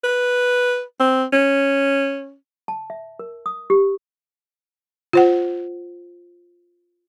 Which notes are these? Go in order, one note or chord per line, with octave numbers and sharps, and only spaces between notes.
B4
C4
C#4
A5
E5
A#4
D#6
G4
F4 C5 F#5